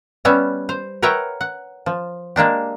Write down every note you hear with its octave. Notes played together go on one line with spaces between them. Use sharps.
G3 B3 C#4 E5
C5
A#4 B4 C#5 E5 F#5 G5
F#5
F3
G#3 A#3 D4 G4